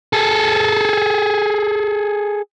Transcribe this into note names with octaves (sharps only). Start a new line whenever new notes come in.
G#4 A4